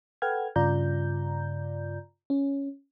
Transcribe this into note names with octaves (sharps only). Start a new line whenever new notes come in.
A4 B4 F#5 G5 F6 G#6
G2 C#3 F4 D5 A#5 G6
C#4